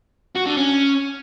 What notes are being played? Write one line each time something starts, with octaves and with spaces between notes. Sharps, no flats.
F#4
D3
C#4